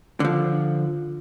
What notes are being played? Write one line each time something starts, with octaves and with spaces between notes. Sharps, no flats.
D3 F3